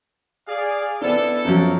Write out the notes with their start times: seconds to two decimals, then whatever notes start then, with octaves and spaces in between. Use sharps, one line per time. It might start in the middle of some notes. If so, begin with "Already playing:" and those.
0.47 G#4 D5 F5
1.02 B3 D4 E4 A4
1.45 F#2 F3 F#3